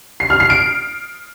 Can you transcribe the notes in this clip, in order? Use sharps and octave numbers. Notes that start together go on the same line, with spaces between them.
C7
F6
C7
D7